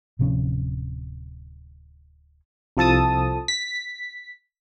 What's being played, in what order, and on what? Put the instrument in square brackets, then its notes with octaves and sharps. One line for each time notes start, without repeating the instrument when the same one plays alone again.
[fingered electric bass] D1 C3 F3 C#4
[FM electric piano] C2 F3 A4 A5 D#6
B6